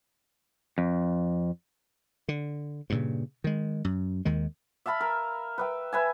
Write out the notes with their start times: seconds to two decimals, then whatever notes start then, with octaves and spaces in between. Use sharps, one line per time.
0.78 F2
2.28 D3
2.90 G2 A#2 C#3
3.44 D#3 G#3
3.85 F#2
4.25 D#2 D#3 G#3
4.86 E5 F5 A5 B5
5.01 A#4
5.58 B4 E5 G5
5.93 B4 E5 G#5